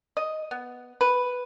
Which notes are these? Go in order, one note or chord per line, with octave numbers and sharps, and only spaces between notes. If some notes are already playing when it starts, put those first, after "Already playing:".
D#5
B3
B4